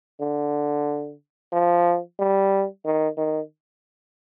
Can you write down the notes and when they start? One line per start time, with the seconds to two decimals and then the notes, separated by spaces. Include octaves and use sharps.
0.20 D3
1.52 F3
2.19 G3
2.85 D#3
3.17 D#3